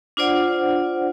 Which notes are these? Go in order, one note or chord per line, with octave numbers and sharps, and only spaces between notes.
D4 F4 C5 D5 F#5